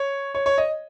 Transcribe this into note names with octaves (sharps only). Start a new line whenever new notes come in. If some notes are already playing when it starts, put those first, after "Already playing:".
Already playing: C#5
C#5
C#5
D#5